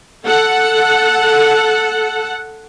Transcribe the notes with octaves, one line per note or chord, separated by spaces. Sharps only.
A4 F#5